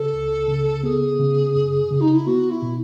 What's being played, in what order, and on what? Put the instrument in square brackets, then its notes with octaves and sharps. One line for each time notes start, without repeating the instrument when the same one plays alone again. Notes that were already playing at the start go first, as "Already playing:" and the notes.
Already playing: [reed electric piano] C#3 [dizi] A4
[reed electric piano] C#2
C#3
[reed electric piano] B3 [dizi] G#4
[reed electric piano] C#3
F#2
C#3
[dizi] D#4
E4
[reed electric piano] B3 [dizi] F#4
[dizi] E4
[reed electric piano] B2